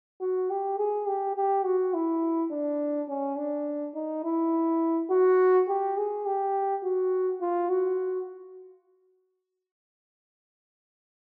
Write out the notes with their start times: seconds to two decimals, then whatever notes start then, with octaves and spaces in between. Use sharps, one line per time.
0.21 F#4
0.50 G4
0.78 G#4
1.08 G4
1.36 G4
1.65 F#4
1.94 E4
2.51 D4
3.09 C#4
3.38 D4
3.95 D#4
4.24 E4
5.10 F#4
5.68 G4
5.97 G#4
6.26 G4
6.84 F#4
7.41 F4
7.70 F#4